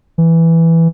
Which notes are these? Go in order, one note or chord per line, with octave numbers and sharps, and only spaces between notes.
E3